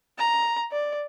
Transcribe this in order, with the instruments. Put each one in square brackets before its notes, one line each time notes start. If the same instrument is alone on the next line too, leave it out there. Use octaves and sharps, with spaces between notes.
[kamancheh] A#5
D5